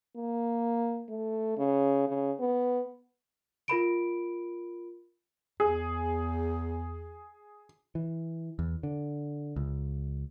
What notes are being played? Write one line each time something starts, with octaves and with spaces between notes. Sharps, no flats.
A#3
A3
C#3
C#3
B3
F4 A#4 B5 D7
E2 G#4
E3
E2
D3
C#2